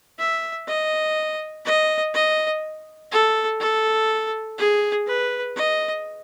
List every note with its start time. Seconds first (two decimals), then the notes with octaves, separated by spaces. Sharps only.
0.19 E5
0.68 D#5
1.65 D#5
2.14 D#5
3.12 A4
3.60 A4
4.59 G#4
5.07 B4
5.56 D#5